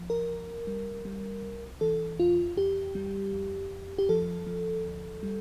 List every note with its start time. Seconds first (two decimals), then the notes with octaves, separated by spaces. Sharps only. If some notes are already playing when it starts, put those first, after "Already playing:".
Already playing: C2 F3
0.10 A#4
0.29 C2
0.67 G3
1.05 G3
1.42 C2
1.81 E3 A4
2.19 E2 F4
2.57 E2 G4
2.95 G3
3.33 F2
3.71 F2
3.98 G4
4.09 F3 A4
4.47 F3
4.85 D2
5.23 G3